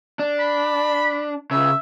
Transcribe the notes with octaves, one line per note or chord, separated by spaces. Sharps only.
D4
B5
C#2 C#3 E5